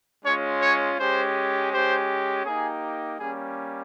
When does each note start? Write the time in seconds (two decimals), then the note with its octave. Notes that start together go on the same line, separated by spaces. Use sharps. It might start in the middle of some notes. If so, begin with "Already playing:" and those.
0.25 G#3 C#4 F4 C#5
0.61 C#5
0.98 G#3 C#4 G4 C5
1.72 G#3 C#4 G4 C5
2.46 A#3 D#4 G4 G#4
3.20 G3 A#3 C#4 G#4